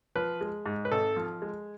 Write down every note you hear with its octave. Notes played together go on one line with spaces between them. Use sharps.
F3 B4
G#3
G#2
B4
G#1 A4
F3
G#3